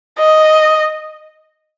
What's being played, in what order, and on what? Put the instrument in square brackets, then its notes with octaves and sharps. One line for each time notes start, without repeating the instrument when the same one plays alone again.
[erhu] D#5